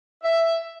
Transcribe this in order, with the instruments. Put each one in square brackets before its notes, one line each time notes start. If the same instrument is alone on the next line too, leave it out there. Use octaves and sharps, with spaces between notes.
[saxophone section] E5